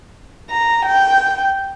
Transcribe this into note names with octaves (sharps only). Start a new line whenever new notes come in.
A#5
G5